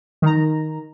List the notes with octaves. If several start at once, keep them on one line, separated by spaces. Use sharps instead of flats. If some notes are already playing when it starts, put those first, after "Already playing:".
D#3 A#5